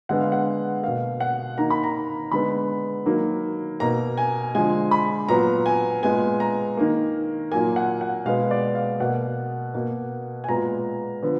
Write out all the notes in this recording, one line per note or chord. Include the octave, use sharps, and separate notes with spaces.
D3 G#3 B3 F#5
F5
F#5
B2 A#3 F5
F#5
D#3 A#3 A#5
B5
A#5
D3 G#3 B3 B5
D#3 F#3 A#3
B2 A#3 A#5
G#5
D3 F3 G#3 G#5
B5
A#2 F#3 B3 A#5
G#5
A#2 G#3 B3 G#5
A#5
D#3 A#3
A#2 F#3 A#3 G#5
F#5
F#5
B2 G#3 B3 F5
D5
F5
B2 A#3 F#5
B2 A#3
G#5
A#2 G#3 B3 A#5
D3 F3 B3